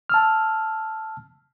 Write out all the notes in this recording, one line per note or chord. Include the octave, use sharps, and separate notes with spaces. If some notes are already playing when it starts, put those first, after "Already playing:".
A5 E6 F6